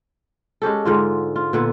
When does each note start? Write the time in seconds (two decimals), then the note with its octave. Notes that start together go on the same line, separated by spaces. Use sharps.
0.62 G#3 C#4 G4 A4
0.85 G#2 D3 F4
1.36 F4
1.53 A#2 D3 B3